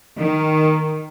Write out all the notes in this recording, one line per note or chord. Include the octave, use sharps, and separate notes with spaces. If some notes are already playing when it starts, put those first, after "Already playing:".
D#3